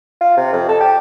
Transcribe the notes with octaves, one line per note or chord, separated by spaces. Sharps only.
F4
C3
F2
A4
G4